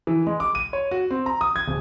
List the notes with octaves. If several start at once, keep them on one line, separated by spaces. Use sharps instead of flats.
E3
G#3
D6
D#7
C#5
F#4
C4
A#5
D#6
G#6
D1